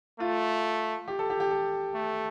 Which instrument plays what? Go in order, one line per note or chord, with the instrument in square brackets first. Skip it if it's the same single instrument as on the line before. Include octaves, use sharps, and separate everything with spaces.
[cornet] A3 [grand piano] F4
[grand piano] G4
A4
G4
G4
A4
[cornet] A3